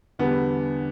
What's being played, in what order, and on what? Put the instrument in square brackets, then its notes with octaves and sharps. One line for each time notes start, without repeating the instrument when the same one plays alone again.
[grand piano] E2 D3 G3 B3